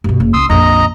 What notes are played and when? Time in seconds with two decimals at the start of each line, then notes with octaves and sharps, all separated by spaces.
0.04 G2 B2
0.20 F#1
0.34 C#2 C6 D#6 E6
0.50 A#1 F2 D#5 A#5